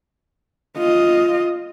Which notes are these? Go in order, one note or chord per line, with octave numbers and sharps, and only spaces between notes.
F4 D#5